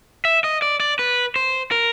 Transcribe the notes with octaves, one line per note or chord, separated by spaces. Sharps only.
E5
D#5
D5
D5
B4
C5
A#4